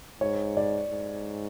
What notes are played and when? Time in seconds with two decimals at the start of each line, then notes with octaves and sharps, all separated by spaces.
0.21 G#2 C#5
0.57 D5
0.91 G#2